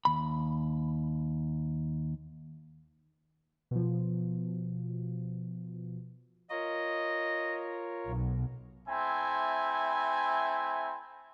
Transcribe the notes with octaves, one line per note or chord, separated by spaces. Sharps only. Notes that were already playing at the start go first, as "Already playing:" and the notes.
D#2 B5
B2 F3
F4 A#4 C#5 D#5
B1
A3 C4 E4 G#5